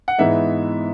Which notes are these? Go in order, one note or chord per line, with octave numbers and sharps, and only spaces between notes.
F#5
G#2 E3 G#3 B3 D#4 E5